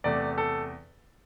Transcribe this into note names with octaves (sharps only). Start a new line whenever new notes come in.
E2 C3 A3 D5
A4